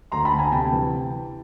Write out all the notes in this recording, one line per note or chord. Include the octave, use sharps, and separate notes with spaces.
D2 A#5 C6
A5 B5
D2
G#5 A#5
C3 G5 A5
E3